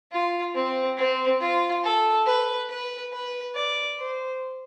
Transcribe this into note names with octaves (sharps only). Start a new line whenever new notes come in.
F4
C4
C4
F4
A4
B4
B4
B4
D5
C5